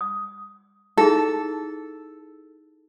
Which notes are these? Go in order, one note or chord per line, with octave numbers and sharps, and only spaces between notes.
D#6
D#4 E4 G#4 A4